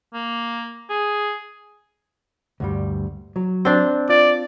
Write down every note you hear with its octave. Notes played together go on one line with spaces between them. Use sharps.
A#3
G#4
D2 G2 G3
F#3
C4 D4
F4 D5